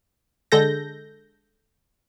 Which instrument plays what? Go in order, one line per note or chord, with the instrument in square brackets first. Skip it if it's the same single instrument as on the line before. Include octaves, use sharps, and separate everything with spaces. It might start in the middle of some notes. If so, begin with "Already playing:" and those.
[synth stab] D3 G#3 A4 G6 A#6